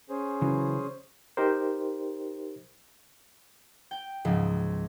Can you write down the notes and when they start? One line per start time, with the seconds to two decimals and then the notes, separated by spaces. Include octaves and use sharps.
0.10 C#4 G#4 C5
0.42 C#3 E3 F#3
1.37 D#4 G4 A#4 C5
3.91 G5
4.25 C#2 G#2 C#3 F3